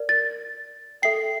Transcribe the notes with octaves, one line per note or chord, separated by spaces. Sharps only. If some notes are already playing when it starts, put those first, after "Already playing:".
Already playing: A#4 D5
A6
A4 E5 G5 C7